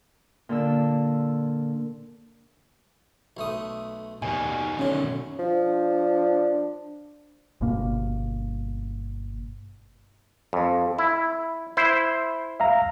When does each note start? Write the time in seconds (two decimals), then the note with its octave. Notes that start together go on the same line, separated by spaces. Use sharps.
0.49 A#2 D3 E6
3.37 B1 A3 D#6
4.22 D#2 B2 D#3 G#5
4.79 F#2 D3 C#4 C#5
5.39 F3 D4
7.61 G1 G2 B2 A#3
10.53 F2
10.99 E4
11.77 E4 C5
12.60 E5 F5 A#5